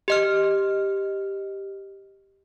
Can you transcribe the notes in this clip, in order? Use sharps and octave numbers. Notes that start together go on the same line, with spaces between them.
G4 D#5 F6